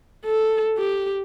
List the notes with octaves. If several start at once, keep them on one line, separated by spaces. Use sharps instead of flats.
A4
G4